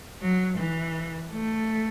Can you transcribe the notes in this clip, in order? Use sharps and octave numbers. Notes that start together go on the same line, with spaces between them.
F#3
E3
A3